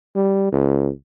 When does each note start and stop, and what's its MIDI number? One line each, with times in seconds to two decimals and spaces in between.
0.15 0.52 55
0.52 0.90 37